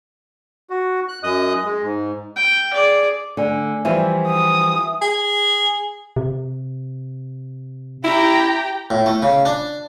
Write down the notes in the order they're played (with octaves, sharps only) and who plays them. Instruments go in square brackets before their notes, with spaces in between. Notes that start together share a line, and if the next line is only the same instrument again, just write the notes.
[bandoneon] F#4
F#6
F#2 D#5 D#6 F#6
G#3
G#2
[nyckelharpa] G5
G#4 D5
[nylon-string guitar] D3 [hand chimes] A3 D5 G#5
[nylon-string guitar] E3 F3 G3 [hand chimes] E5 G#5
[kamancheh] D#6
[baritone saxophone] G#4
[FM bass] C3
[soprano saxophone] E4 [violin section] G4 G5 A#5
[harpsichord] A2
A3
C#3
D4